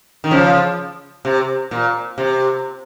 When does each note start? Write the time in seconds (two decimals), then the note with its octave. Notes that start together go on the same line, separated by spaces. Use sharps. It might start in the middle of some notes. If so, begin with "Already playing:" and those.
0.24 D#3
0.31 C#3 F3
1.25 C3
1.71 A#2
2.18 C3